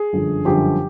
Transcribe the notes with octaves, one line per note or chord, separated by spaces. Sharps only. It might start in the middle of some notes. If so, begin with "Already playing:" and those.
Already playing: G#4
G1 F#2 D3 F3
G1 F#2 D3 F3 G4